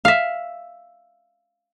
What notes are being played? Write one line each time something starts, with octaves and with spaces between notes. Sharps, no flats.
E5 F5